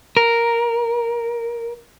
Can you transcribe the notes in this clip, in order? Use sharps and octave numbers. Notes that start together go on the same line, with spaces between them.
A#4